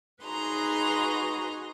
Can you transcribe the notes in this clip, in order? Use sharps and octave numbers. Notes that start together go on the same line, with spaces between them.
D#4 F#4 G#4 B4 A#5 C6